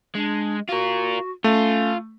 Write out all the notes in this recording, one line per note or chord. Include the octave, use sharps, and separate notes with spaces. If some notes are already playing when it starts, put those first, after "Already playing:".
G#3 D4
F4 F#4 A#4
A3 C#4 F4